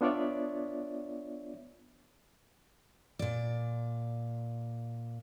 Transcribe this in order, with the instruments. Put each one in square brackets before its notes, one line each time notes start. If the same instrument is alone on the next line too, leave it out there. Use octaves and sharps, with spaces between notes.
[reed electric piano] B3 D4 F4 C#5 D5 E5
[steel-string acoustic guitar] A#2 D5